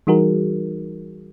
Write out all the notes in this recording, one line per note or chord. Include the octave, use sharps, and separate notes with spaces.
E3 G3 D#4 F#4 G#4 A#4